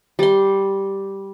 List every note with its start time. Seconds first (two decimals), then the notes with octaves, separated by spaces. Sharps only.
0.19 G3 C6